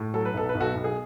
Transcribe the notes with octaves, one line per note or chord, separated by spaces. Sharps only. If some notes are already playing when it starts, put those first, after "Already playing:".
Already playing: A2
F#3 A4
B4
B1 A4
B4
B1
F#4 A4
B1
G#4